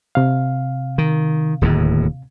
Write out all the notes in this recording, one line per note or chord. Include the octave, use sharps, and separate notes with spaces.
C3 F5
D#3
D1 D#2 A2